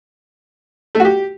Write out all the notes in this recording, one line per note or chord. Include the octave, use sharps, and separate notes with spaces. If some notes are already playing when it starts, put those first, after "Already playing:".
A3
F#4
G4